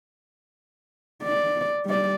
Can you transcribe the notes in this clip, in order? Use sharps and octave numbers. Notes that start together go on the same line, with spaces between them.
D5
G3 D5